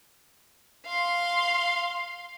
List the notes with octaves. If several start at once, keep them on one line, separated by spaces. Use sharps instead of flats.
F5 C6